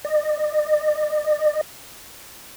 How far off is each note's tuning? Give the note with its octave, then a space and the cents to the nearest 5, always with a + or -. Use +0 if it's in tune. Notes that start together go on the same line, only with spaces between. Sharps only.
D#5 -45